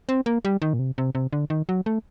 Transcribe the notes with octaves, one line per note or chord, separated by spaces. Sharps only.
C4
A#3
G3
D#3
A#2
C3
C3
C3
D3
D#3
F#3
A3